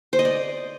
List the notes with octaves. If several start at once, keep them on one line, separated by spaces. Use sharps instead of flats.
C5
D#5
D5